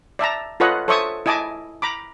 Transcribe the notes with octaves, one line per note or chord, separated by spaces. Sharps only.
D5 E5 A5 A#5
F4 A4 B4 C#5 D#5 F#5
A4 C5 C#5 E5 C#6 D#6
E4 D#5 G#5 A5 D6
A#5 B5 D6